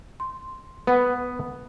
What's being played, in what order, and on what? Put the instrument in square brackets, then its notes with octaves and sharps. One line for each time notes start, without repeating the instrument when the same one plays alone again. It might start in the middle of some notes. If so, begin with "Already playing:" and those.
[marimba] C6
[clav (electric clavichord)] B3 [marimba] B4 F#5